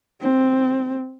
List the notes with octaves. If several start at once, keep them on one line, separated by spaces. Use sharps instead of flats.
C4